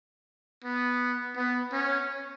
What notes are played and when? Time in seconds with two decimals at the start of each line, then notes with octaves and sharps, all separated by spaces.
0.64 B3
1.36 B3
1.72 C#4